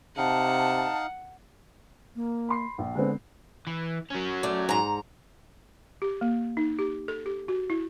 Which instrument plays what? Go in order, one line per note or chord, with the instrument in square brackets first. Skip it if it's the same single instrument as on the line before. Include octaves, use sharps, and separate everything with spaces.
[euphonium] C3 [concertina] D#4 F5 [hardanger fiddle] F#5 [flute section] A5
[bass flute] A#3
[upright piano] B5 C6 C7
A#1
[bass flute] D3 [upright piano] G#3 B3 C4
[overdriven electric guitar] E3
F#3 C#4
[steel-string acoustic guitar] A3 D5
G#2 A#5
[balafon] G4
A#3
D#4
G4
A4
G4
F#4
E4